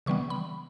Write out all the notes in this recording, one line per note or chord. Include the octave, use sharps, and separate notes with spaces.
C#3 E3 G3 B3 C#6
B5